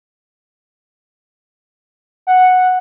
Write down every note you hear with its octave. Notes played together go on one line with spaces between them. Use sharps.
F#5